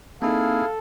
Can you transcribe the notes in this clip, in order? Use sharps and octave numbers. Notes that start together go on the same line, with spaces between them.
A#3 C4 D#4 E4 G#4 A4 F5